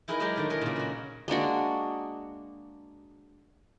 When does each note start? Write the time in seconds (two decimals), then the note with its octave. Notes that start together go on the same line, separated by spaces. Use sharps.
0.08 D#4 E4 G#4 A#4 B4 D#5
0.20 F#3 G#3 G4 G#4 A#4 A#5
0.36 D3 D#3 A3
0.50 E4 G#4 A#4 B4 C#5 D#5
0.61 A#2 C#3
0.76 G#3 F#4
1.28 G#3 A#3 D4 F#4